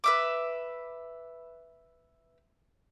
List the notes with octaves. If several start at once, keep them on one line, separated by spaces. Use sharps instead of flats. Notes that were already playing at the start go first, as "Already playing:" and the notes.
B4 E5 D6